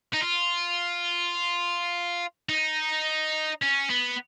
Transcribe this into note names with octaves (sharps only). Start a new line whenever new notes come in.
D#4
F4
D#4
C#4
B3